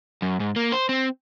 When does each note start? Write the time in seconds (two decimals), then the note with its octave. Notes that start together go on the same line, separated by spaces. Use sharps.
0.22 F#2
0.40 G#2
0.56 A#3
0.72 C5
0.89 C4